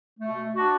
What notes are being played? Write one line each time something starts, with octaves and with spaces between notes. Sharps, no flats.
B2 A3
D4 F#4